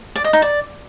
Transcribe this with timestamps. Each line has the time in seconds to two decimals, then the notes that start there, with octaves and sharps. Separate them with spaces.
0.16 D5
0.24 D#5
0.33 D#4
0.42 D5